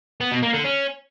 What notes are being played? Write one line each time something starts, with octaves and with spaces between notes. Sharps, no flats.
B3
B2
A#3
D3
C#4